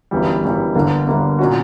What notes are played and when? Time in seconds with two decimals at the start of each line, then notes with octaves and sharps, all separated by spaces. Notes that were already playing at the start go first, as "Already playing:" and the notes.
0.11 G1 F#2 E3 G3
0.43 G1 F#2 E3 G3
0.75 G1 G2 D3 A#3
1.07 G1 G2 D3 A#3
1.39 A#2 F#3 C#4 F#4